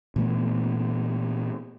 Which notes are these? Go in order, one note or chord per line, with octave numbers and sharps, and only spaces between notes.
A#2 E3 A3 B3